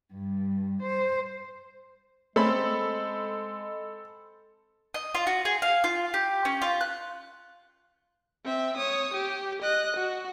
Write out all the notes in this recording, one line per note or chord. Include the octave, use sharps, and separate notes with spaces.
G2
C5
G#3 A3 C4 C#4 G#4 A4 B5
D#5
F4
F#4
G#4
F5
F4
G4
C#4
F4
F#6
C4 E5
C#5 D#6
G4
D#5 F#6
F#4